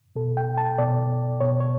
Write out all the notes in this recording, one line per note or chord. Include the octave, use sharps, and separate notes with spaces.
B2 A4
G5
A5
B2 D5
B2 C#5
C#5